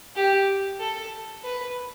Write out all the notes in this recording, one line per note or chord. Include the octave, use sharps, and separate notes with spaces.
G4
A4
B4